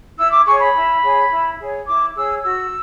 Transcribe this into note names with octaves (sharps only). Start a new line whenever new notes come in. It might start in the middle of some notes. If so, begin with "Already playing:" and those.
E4 E6
D6
G#4 C#5 C#6
B5
E4
G#4 C#5
E4
G#4 C#5
E4 D6
G#4 C#5 E6
F#4 E6